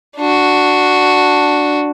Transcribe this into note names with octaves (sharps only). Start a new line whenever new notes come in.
D4 F#4